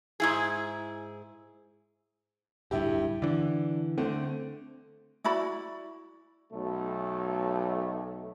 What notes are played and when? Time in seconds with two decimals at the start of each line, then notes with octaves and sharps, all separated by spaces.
0.20 G#2 E4 G#4
2.71 D1 G2 E4 G4
3.22 D3 E3 D4
3.98 D3 A3 C4
5.24 E4 F#4 D5 B5
6.52 B1 A3